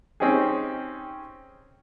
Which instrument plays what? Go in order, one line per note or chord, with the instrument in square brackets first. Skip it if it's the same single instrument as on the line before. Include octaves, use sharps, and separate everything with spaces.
[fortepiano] C4 C#4 D#4 G4 G#4